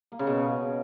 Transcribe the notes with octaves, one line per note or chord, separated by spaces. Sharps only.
A#3
C#3
B2